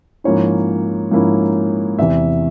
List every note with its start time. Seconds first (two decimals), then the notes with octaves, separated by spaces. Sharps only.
0.24 G#2 F3 A#3 C#4 E4 C#5
1.11 G#2 F3 A#3 C#4 E4
1.98 E2 C3 E3 E5